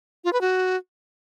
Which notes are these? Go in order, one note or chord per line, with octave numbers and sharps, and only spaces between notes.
F4
B4
F#4